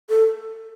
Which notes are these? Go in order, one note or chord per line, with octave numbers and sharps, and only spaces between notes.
A4